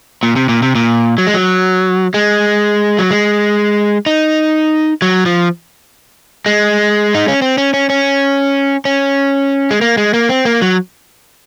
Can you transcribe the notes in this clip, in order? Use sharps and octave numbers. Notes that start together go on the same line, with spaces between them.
A#2
C3
A#2
C3
A#2
F#3
G#3
F#3
G#3
F#3
G#3
D#4
F#3
F3
G#3
D#4
C#4
C4
C#4
C#4
C#4
C#4
G#3
A#3
G#3
A#3
C4
A#3
F#3